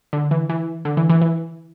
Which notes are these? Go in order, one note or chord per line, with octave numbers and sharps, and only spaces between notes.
D3
E3
E3
D3
E3
E3
E3